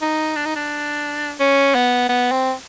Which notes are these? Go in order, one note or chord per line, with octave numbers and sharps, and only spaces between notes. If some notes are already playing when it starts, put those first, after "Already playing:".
D#4
D4
D#4
D4
C#4
B3
B3
C4